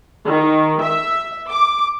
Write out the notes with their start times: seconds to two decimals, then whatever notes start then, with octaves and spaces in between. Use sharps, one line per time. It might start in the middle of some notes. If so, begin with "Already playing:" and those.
0.25 D#3
0.82 E5
1.52 D6